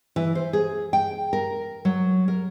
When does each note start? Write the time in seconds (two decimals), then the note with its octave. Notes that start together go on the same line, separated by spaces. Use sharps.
0.16 E3
0.35 C5
0.53 G#4
0.93 G5
1.33 A#4
1.85 F#3
2.28 A#4